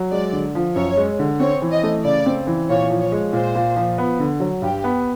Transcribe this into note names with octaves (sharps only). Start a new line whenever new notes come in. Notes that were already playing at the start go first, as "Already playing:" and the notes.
Already playing: F#3
G#3 D5
D3
F3
F#2 C#5
G#3
D3
C4 C#5
E3
D#5
A3
C#3 D5
C4
E3
A#2 C#5
F3
C#5
G#3
A#2 C5
A#2
F3
B3
D3
F#3
G2 G4
B3